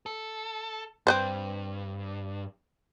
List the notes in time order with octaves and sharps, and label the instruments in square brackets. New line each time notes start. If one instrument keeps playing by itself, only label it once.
[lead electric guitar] A4
[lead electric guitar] G2 [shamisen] C4 B4 C5